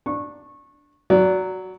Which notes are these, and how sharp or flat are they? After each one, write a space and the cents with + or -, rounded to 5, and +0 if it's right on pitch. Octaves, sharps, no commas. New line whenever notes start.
D4 +0 C#6 -20
F#3 +0 D5 -30